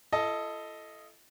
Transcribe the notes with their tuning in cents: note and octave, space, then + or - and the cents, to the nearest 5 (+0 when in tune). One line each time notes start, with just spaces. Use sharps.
E4 +45 A4 +0 D#5 +0